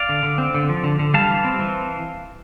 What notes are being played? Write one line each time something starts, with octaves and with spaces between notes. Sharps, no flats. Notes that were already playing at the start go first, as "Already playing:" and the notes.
Already playing: D5 F5
D3
D3
C4
D3
F3
D3
D3
G3 F5 A5
E3
C4
E3